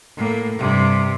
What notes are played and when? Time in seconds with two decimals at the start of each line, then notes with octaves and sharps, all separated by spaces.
0.16 A2 A#3
0.58 G2 C3